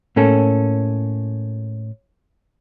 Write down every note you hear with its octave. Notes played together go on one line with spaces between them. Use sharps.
A2 A#3 C#4 A4